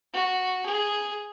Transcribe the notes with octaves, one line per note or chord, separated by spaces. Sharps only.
F#4
G#4